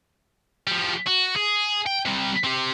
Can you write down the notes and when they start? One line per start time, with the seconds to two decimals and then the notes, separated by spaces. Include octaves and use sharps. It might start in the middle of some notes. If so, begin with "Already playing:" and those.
0.67 F3 G3
1.07 F#4
1.36 G#4
1.87 G5
2.06 C3 G3
2.44 C4 G4